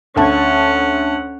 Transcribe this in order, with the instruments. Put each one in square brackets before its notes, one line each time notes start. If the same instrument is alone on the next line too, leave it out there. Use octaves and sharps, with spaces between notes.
[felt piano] D2 A5 [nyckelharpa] C#4 F#5